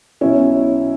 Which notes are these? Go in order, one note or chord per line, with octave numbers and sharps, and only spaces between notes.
B1 B2 F#3 C#4 E4